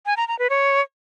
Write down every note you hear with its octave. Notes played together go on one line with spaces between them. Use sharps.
G#5
A#5
A#5
B4
C#5